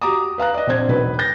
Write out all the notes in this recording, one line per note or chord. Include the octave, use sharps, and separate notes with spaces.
F#4 G4 A#5 D6 D#6
B4 F5 A#5 F#6
D5 D#5
A#1 C4 D4 C5 G#6
E1 B1 F#3 B4
G6 A6 A#6